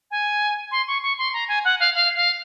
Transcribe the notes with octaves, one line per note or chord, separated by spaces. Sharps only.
G#5
C6
C#6
C#6
C6
A#5
G#5
F#5
F5
F5
F5